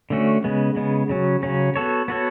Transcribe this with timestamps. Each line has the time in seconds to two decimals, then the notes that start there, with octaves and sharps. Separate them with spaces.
0.10 D3 A3 C#4 F#4
0.44 C#3 G#3 B3
0.76 C#3 G#3 B3
1.10 C#3 F#3 C#4
1.43 C#3 F#3 C#4
1.76 B3 F#4 A4 C#5
2.08 B3 F#4 A4 C#5